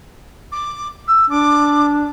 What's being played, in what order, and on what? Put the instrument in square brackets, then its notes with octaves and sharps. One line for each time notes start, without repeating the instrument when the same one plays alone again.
[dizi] D6
E6
[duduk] D4 [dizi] D6